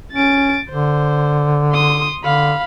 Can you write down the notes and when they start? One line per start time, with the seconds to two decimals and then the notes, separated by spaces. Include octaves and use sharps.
0.13 C#4 A6 D7
0.70 D3 C5
1.72 C6 D#6
2.24 D3 F5 B5